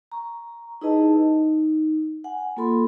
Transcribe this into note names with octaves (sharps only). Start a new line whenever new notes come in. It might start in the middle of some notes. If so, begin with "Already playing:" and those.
A#5 C#6
D#4 E4 G#4 B4 D#5 A5
D#4
F#5 G#5
A#3 F4 A4 B5 C6